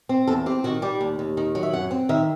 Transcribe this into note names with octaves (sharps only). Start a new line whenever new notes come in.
C4
E2 A4
C4 G4
D#3 F#4
G3 G4
D#2
D#2
D#3
F#3
E5
F#2 F#5
C4
D#3 E5